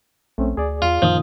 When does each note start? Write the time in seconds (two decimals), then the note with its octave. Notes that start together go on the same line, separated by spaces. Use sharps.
0.38 A#1 A3 C4 C#4
0.57 D2 G#4 D5
0.82 E2 F4
1.02 F#2 A#2 D#3 F3 D#6